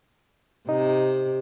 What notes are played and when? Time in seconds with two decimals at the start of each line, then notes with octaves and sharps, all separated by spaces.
0.69 C3 D#4